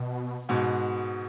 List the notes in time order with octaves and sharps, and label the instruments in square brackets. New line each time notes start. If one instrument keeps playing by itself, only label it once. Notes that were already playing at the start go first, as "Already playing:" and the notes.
Already playing: [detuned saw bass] B2
[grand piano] G#2 B2